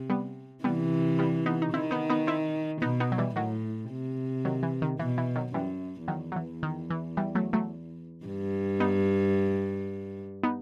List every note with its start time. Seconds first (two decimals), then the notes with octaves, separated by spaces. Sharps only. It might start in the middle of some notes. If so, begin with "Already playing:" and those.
Already playing: C3
0.10 G3 B3
0.64 C3 E3 G3 B3
1.19 G3 B3
1.46 B3 D#4
1.62 D#4
1.73 D#3 C4 E4
1.91 B3 D#4
2.10 B3 D#4
2.27 C4 E4
2.82 B2 B3 D#4
3.00 B3 D#4
3.12 F#3
3.18 E3 G3
3.36 A2 D#3 F#3
3.91 C3
4.45 D#3 F#3
4.63 E3
4.82 D#3
4.99 B2 E3
5.18 E3
5.36 D#3 F#3
5.54 F#2 E3 G3
6.08 E2 D#3 F#3
6.32 F#3
6.36 E3
6.63 D#3
6.90 E3
7.17 E3 G3
7.35 F#3 A3
7.53 F#3 A3
8.26 G2
8.80 B3 D#4
10.43 B3 D#4